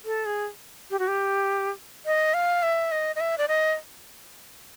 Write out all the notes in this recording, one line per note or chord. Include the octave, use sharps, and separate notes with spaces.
A4
G#4
G4
F#4
G4
D#5
F5
E5
D#5
D#5
E5
D5
D#5